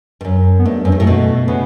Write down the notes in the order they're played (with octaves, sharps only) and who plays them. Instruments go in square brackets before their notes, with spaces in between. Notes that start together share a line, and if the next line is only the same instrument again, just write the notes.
[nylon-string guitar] G2
F#2
[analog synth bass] B3
[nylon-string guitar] G2 [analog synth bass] A3
[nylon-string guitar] F#2
G2
A2
[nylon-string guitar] B2 [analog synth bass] A3
[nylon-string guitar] C#3 [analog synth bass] B3